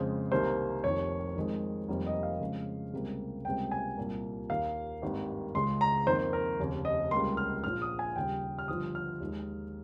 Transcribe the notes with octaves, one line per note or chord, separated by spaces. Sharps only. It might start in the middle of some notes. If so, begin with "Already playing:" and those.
Already playing: F2 C#3 G#3 C5
C2 C3 D#3 A#3 C5
F1 F2 D#3 C#5
F2 D#3 G#3
F1 F2 D#3 G3 A#3
D#5
F5
F2 C#3 G#3
C#2 C3 G3 A#3
C#2 C3 G3 A#3 G5
G#5
C2 A#2 G3 A#3
D#2 D#3 A#3 F5
G#1 G2 D#3 G3 A#3
C#2 C#3 G#3 C6
A#5
F2 D#3 A#3 C5
A#4
F1 D#2 C#3
D#5
C#2 C3 G3 A#3 C6
F6
A#1 A#2 F3 F6
D#6
G#5
D#2 C#3 G3 G5
F6
G1 G2 F3 D#6
F6
D#2 D#3 G#3